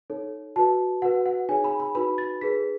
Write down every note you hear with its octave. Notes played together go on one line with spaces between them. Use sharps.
D#4 A4 C#5
F#4 B4 A5
F#4 B4 F#5
F#5
D#4 G#4 C#5 G#5
B5
B5
D#4 F#4 B4 B5
A6
D#4 G#4 B4 B6